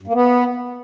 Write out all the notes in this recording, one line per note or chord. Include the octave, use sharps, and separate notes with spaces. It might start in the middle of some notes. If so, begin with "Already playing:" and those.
G2
A#3
B3